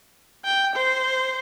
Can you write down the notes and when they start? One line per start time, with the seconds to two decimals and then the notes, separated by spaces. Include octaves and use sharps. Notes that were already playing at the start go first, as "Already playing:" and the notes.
0.45 G5
0.76 C5